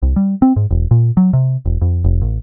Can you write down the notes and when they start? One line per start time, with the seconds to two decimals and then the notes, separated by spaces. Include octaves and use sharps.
0.02 C2
0.16 G3
0.42 C4
0.56 G#2
0.71 E1
0.91 A#2
1.17 F#3
1.33 C3
1.66 E1
1.81 F2
2.04 F1
2.22 A1